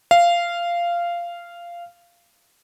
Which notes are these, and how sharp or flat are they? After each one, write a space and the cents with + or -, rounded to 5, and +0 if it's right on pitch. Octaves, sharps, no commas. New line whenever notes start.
F5 -15